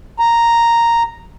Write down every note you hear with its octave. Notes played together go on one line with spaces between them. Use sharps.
A#5